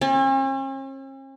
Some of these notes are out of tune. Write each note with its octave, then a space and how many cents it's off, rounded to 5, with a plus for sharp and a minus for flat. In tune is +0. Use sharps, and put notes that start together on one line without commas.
C#4 -45